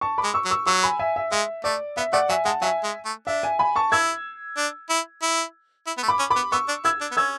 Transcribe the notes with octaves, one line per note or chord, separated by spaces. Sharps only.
A5 C#6
B5 D6
G#3
C#6 E6
F#3
C#6 E6
F#3 C#6 E6
G#5 B5
E5 G#5
E5
G#3 E5
A3 D5
B3 E5
A3 D5 F#5
F#3 E5 G#5
G#3 F#5 A5
F#3 E5 G#5
G#3
A3
D4 E5
E5 G#5
G#5 B5
A5 C#6
E4 E6 G#6
D4
E4
E4
E4
B3
A3
B5 D6
C#4
B5 D6
B3
B3 C#6 E6
D4
E4 E6 G#6
D4
B3
C#4 E6 G#6